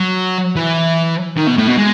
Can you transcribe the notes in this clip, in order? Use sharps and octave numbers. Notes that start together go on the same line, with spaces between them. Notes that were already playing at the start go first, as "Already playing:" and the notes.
Already playing: F#3
E3
D#3
B2
A2
B2
G#3